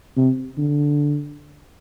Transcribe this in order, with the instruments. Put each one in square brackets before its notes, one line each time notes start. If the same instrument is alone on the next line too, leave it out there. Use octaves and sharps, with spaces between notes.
[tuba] C3
D3